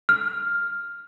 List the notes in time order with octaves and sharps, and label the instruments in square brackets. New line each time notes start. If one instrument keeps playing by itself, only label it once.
[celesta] F6